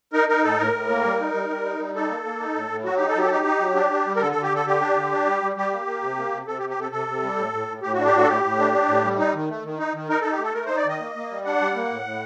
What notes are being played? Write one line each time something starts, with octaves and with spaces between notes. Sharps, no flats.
D#4 A#4
D#4 A#4
A2 A4
A2 A#4
A2
A#3
G3
D#4
G3
G3
D#4
G3
D#4 A4
A#3
A#3
D#4
A2
A2
F#3 F#4
D#4 G4
A4
F#3 G4
A4
D#4 G4
D#4
F#3
D4
D4
G3
A#4
D3 A4
D3 A4
G4
D3 A4
D3 G4
D4
D3
D4
G3
G3
G3 G4
A#3
A#3
C3
A#3
C3
C3 A4
G4
C3
G4
C3 A4
C3 A4
C3
G3
A2
A2
A2
A2 G4
D4 F#4
G4
A2 F#4
A4
A2 G4
A2
D4
D4
A2
G3
D#4
D#3
A3
D#3
D#4
D#3
D#4 A#4
D#4 A4
G4
A3 A4
A3 A#4
D#4 C5
D5
D#3 D#5
A#3
A#3
G3
D4 F#5
G3
A#3
A2
A2